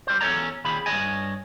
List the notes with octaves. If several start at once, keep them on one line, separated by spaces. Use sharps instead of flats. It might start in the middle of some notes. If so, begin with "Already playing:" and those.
G3 C5
E2 C#4 A4 C#5 D5 A#5
D#2 A#2 G#4 B5
G2 C#5 D#5 G#5